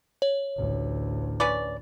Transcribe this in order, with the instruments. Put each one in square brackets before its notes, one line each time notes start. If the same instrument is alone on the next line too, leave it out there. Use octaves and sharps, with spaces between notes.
[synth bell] C#5
[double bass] A1 D2
[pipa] C#4 B4 D5